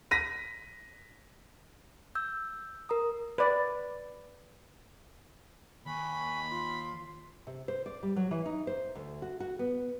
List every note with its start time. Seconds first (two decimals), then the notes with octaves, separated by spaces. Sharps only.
0.11 A#6 B6 D#7
2.15 E6 G6
2.89 A#4 A#5 D#6
3.38 B4 D5
5.86 D#2 G#5 B5 C#6 F#6
6.49 F4 C6
7.47 C3
7.68 C5
7.86 D5
8.03 G3
8.16 F#3
8.31 E3
8.46 D#4
8.67 C5
8.95 D2
9.22 F#4
9.40 F#4
9.59 B3